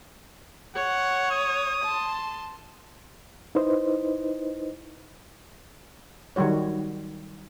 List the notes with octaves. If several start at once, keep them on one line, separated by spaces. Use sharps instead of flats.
C#5 F#5
D#6
A5 C6
D#4 E4 B4 C5 D#5
D#3 F#3 G3 F#4 C#5